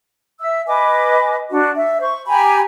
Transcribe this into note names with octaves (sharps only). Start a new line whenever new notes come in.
E5 E6
B4 D#5 G#5 D6
D4 F#4
E5
C5 C#6
G4 G#5 A#5 B5